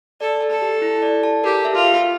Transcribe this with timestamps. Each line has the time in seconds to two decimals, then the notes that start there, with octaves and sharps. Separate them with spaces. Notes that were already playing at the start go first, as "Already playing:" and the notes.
0.21 A4 D5
0.41 A5
0.50 A4
0.62 G4
0.82 E4
1.02 D5
1.23 A5
1.44 G4 A#4
1.65 E5
1.74 F4
1.85 G4